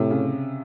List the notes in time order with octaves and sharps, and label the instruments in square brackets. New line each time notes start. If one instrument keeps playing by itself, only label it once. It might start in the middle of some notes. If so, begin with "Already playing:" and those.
Already playing: [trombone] A2 [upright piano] C3
[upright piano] C#3